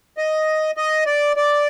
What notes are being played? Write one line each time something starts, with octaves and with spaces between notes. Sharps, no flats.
D#5
D#5
D5
D5